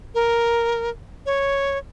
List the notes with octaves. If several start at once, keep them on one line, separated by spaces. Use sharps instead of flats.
A#4
C#5